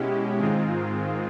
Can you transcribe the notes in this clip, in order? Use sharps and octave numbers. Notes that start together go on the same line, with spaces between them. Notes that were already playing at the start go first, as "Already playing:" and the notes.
Already playing: B2 G#3 C#4 E4 G4
G#2 D#3 G#3 C4 F4